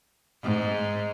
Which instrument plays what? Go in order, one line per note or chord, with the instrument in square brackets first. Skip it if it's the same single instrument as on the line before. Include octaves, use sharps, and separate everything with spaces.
[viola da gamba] G#2